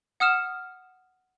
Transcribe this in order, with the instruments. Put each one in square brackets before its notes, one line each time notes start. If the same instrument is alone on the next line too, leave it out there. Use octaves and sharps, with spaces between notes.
[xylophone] F#5 D#6 F6 E7